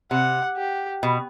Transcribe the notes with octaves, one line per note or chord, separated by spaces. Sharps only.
C3 F#5
G4
B2